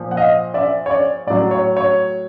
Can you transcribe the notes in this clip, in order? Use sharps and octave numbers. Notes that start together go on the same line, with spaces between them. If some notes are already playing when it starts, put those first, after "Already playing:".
Already playing: A#2 F3
F#5
D#5 F5
D5 E5
C#5
D5
A2 F#3 D5
C#5
C#5